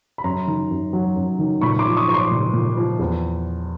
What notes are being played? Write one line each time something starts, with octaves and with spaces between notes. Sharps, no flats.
B5
F#2 A#5 C6
D#3
F#2
F#3
F#2
D#3
A#2 B5 C#6
C#6
C6 D6
F3
C#6 D#6
F3 C#6
C6 D6
A#2
A#2
F3
E2